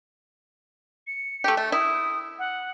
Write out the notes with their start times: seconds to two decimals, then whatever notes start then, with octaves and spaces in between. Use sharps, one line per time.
1.07 C#7
1.44 A3 G4
1.57 A3
1.72 E4 D#6
2.39 F#5